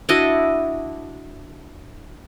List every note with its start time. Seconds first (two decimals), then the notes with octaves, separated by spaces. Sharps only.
0.09 D4 E4 F#4 D#5